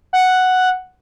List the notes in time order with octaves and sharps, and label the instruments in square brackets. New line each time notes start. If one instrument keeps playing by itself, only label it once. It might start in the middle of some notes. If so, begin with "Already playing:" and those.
[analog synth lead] F#5